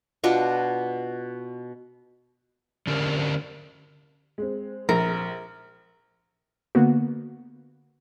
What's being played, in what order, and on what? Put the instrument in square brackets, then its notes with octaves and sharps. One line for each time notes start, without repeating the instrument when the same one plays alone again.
[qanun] B2 D4 F4 C#6
[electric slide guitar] D3 C#4 D4 G4 A#4
[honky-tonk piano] G#3 C4
[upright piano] A#1 [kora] A#4
[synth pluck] D3 A#3 B3 F#4